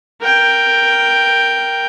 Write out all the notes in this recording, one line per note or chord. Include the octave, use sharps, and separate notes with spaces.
A#4 G5